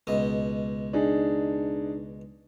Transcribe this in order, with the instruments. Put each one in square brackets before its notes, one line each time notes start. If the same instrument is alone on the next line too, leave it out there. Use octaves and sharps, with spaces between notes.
[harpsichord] C#2 B2 D#5
[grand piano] D4 D#4 G#4